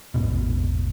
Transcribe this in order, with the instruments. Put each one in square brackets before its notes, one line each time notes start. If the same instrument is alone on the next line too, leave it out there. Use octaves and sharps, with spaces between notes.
[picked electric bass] A1 E2 G#2 B2